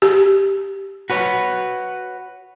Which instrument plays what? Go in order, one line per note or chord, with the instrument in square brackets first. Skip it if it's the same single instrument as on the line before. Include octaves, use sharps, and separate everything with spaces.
[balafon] G4
[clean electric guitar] F#4 B4 C#5